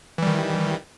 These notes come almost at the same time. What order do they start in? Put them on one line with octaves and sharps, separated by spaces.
E3 G3 D#3